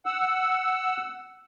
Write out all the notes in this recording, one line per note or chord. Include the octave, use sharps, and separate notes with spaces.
F#5 E6